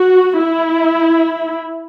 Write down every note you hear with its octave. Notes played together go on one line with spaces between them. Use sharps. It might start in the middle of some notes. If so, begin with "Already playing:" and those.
Already playing: F#4
E4